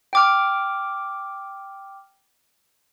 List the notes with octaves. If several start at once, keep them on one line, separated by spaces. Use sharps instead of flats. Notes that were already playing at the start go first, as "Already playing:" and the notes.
G5 D6 F6